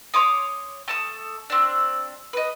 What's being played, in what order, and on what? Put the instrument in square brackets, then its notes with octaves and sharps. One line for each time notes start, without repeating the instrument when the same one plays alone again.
[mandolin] C#5 C6 D6 D#6
A3 A5 D#6
C4 D4
B4 D#5